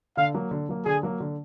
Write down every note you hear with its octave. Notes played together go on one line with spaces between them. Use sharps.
D3 F5
F#3 A#3
D3
F#3 A#3
D3 G#4
F#3 A#3
D3